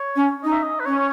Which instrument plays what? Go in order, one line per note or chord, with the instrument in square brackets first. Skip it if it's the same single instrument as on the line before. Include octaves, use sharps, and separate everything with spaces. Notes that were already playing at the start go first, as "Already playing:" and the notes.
Already playing: [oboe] C#5
[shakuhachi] C#4
[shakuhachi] D#4 [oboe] D#5
[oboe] E5
D#5
B4
[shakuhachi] C#4 [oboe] C#5